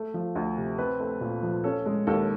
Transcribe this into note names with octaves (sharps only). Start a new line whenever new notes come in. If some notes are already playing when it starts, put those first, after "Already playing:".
Already playing: A3
F3
D2
C3
C4 B4
A3
A#2
F3
C#4 A4
G#3
D#2 A4